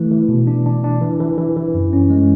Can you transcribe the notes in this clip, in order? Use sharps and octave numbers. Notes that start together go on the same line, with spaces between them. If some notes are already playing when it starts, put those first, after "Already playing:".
Already playing: E3 A3 E4
E3
B2
D4
D4
D4
E3
E3
E3
E3
F#2
C#4
G#3